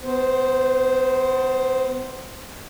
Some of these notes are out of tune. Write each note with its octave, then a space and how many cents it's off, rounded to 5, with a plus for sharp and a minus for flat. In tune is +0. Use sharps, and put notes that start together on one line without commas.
B3 +35 C5 +0